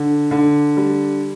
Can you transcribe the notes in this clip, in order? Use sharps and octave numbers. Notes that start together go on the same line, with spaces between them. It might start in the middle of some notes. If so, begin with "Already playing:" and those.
Already playing: D3
D3
G3